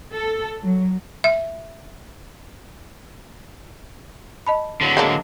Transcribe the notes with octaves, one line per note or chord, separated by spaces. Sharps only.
A4
F#3
E5
D#5 A5 B5
D3 F#3
G#3 A#3 D4